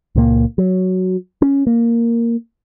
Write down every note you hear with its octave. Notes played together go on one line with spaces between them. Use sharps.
C#2 A#2 F3 A#3
F#3
C#4
A#3